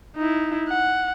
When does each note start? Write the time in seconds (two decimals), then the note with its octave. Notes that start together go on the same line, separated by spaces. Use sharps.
0.16 D#4 E4
0.69 F#5